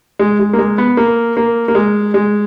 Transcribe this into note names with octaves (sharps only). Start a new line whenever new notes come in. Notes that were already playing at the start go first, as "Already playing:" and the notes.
G#3
G#3
A#3
G#3
B3
A#3
A#3
A#3
G#3
G#3